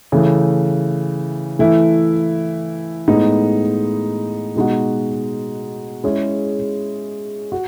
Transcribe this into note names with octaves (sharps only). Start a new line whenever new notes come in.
C#3 E3 A3
E3 A3 E4
A2 G#3 B3 D#4
B2 G#3 D#4 F#4
G#3 C#4 E4 G#4
F#4